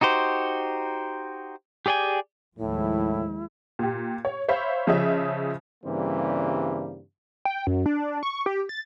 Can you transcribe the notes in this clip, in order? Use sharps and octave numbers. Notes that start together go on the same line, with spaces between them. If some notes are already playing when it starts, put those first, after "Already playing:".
D#4 F#4 G4 C5
G4 G#4 D5 G5 G#5
D#2 A2 F3 G#3 E4
A#2 G4
C#5
C5 C#5 E5 F5 B5
C#3 F3 C#4 G#4 D#5 E5
G2 C#3 E3 G3 A#3 C4
G5
F#2
D4
C#6
G4
A6